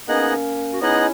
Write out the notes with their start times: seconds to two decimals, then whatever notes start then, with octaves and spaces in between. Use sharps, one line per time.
0.08 A#3 B3 C#4 D#4 G#4 D#5 F#5
0.72 F#4
0.80 B3 C#4 D#4 E4 G#4 D#5 F#5